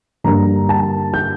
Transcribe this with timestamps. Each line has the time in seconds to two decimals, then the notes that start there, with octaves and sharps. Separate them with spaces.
0.24 G2 D3 G3 A#3 A#5
0.69 A5
1.14 G6